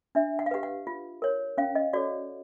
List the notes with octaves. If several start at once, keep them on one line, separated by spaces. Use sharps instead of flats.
D4 E5
F#5
F5
G4 B4 F#5
F#5
F4
A#4 C#5
C#4 F5
D#5
F#4 A4 C#5 D5